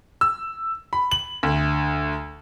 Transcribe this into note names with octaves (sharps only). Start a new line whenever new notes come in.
E6
B5
F#7
D2